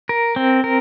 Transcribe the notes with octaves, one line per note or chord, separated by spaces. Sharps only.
A#4
C4
A#4